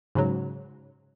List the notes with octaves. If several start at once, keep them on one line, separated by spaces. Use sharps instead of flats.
G#2 C#3 F#3